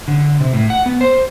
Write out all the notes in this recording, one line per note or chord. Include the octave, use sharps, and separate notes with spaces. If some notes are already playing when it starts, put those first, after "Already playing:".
D3
C3
A2
F#5
B3
C5